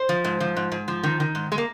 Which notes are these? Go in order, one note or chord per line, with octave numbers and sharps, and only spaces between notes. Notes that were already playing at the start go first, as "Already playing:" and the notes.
Already playing: C5
F3
G#2
F3
G#2
G#2
F3
D#3
D#3
G#2
G#3
A#3